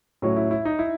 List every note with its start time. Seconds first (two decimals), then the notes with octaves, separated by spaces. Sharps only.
0.22 A2 F#3 C#4 E4
0.36 E4
0.51 E4
0.65 D#4
0.79 E4